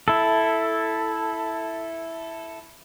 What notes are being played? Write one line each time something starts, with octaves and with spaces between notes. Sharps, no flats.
E4 A4